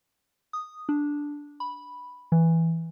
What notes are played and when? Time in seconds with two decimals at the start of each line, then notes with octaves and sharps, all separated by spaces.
0.53 D#6
0.89 D4
1.60 B5
2.32 E3